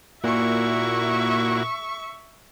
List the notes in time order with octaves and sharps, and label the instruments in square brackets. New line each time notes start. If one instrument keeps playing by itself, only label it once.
[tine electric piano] A#2 [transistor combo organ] A#3 E4 F#4 [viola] E5 C#6